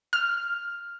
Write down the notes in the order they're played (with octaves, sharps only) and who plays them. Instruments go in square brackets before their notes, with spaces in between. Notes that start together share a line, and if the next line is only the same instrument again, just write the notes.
[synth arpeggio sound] F6